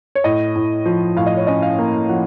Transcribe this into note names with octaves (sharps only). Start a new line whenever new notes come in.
C#5
A2 D#5
A2
F3
A2 F5
D#5
C#5
C#4 D#5
F5
A#3
F3 F#5